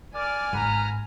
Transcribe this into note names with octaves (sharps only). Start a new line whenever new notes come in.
A#4 D5 G#5 F6
G#1 B4 F#5 A#5